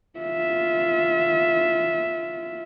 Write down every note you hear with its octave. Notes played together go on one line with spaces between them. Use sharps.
F4 E5